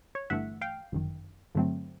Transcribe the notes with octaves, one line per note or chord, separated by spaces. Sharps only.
C#5
G1 G2 E3 A3 E5 F#5
F5 G5
G1 F#2 D#3
G2 D3 F#3 A3 C4